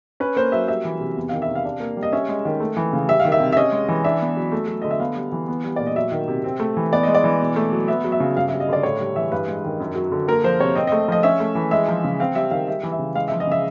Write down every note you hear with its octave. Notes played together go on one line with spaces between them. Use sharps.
C#4 B4
A#3 C5
F#3 E5
G3 E5
E3
C3
E2
D#3 F5
E5
C3
F5
D4
A#3
G3
D#5
C#4 E5
G#3
D#3
A3
E3
C#3
G3 E5
F5
D#3
E5
C3
E5
C#4 D#5
G#3
E3
D4 E5
B3
F#3
A3
F#3
D3 D#5
E5
B3 F5
G3
E3
B3
G3
A#2 D5
D#5
F#3 E5
D#3
C3
C4
A3
E3
B3 D5
G#3 D#5
D5
E3
B2
A3
F#3
B3 E5
F#3
E5
C#3
G2 F5
E5
G3
D#5
D3 D5
A2 C#5
G3
E3 E5
G2 B4
G#3
D#3
F#2
F#3
D3
A#3 A#4
F3 C5
C3 C#5
C4 D#5
D#5
A3
F3 D#5
C#4 E5
A3
E3
G#3 E5
F3
C#3
C4 F5
G3 E5
D#3 F5
G3 E5
E3
E5
C#3
G#3 F5
E5
F3
D#5
C#3 E5